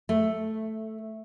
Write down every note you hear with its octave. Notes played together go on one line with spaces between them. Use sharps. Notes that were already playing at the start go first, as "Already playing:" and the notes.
A3